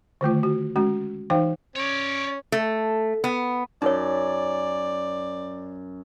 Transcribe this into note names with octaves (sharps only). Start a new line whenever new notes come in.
D3 D#3 A3 F4
F#4
G#3 C#4 F#4
E3 D#4 C5 F5 G5
C#4 C#5 D5
A3
B3
F#2 D#4 C#5 D5